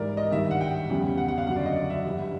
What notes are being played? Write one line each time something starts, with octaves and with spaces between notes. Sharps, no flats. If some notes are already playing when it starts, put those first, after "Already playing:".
Already playing: G#2 E3 G3 A#4 D5
D#5
G2 D#3 G3 E5
F#5
G5
E2 C#3 E3 G3
F#5
F#5
F5
F#2 D3 F#3 F#5
D5
D#5
D5
E5
G2 E3 G3